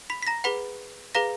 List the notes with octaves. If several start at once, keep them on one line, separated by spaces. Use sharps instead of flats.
B5 B6
B6
A#5 A#6
G#4 B4 F#5 B5 B6
G#4 B4 F5 A#5 A#6